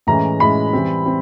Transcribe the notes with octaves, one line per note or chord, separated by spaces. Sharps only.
A2 E3 G#3 C#4 A#5
A2 E3 G#3 C#4 B5
E3 G3 C4
C4